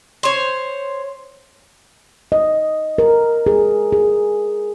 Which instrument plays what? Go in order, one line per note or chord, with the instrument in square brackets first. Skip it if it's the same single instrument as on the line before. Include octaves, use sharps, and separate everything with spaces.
[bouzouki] C5 C#5
[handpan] D#5
A#4
G#4
G#4